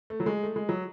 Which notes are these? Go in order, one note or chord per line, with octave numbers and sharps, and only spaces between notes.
A3
F#3
G#3
A3
G#3
F#3